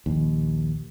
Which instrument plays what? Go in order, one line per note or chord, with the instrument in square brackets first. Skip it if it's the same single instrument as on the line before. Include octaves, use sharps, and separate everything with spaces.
[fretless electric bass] A#1 D#2